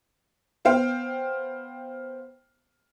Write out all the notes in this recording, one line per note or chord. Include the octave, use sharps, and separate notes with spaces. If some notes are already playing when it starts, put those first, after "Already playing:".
B3 C5 F5 G5